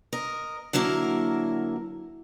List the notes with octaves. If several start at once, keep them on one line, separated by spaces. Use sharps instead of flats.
A#4 D#5
D3 F#3 A#3 E4 A#4